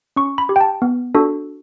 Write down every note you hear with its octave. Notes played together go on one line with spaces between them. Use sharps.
C#4 C#6
B5
G4
G5
A5
B3
D4 F#4 A4